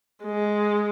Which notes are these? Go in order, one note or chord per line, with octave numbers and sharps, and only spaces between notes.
G#3